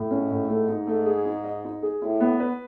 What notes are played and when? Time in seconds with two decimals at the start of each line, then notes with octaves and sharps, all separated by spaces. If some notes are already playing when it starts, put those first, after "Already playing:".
Already playing: A2
0.11 G#2 C#4
0.31 A2
0.49 G#2 A3
0.68 D#4
0.87 A3
1.06 G#4
1.25 D#4
1.44 D#5
1.64 D#4
1.83 G#4
2.02 A2 E4
2.21 B3
2.40 B4